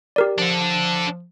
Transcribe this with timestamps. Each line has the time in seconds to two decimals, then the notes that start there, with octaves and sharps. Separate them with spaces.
0.16 G4 A#4 D5
0.38 F3 D4 A4